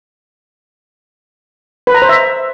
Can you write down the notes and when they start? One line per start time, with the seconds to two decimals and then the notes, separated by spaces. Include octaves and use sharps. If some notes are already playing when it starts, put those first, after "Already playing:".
1.87 B4
1.94 A#5
2.02 C5
2.09 E5